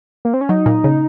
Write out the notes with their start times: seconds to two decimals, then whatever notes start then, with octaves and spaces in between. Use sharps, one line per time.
0.25 A#3
0.34 C4
0.41 C#4
0.49 F#3 D#4
0.66 A#2
0.84 C#3